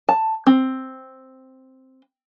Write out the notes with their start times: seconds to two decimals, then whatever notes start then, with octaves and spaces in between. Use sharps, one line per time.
0.09 A5
0.47 C4